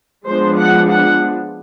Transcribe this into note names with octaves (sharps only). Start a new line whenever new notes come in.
F3 G#3 B3 D4 C5
F#5
F#5